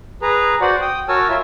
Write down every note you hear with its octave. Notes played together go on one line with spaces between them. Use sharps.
G#4 B4 A#5
F#4 C5 D5 F#5
G5 D#6
F#4 A#4 C#5 G#5 A5 E6
F4 E5